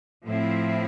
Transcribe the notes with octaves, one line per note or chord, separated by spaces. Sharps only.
A2 F3 C4 E4